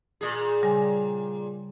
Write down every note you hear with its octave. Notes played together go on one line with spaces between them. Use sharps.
A#2 G#4 D#6
C#3 G3 G#5